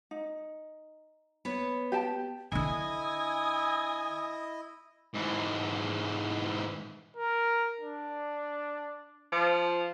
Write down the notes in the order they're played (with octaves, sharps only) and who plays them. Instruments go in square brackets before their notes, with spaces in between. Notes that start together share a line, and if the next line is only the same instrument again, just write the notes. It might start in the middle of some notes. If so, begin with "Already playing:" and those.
[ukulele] D#4
[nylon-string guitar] B3 B4 C#5
[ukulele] G4 G5 A5
[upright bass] D3 D4 [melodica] E4 D#5 [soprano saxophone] G#5 [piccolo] D#6
[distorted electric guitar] G#2 E3
[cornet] A#4
D4
[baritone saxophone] F3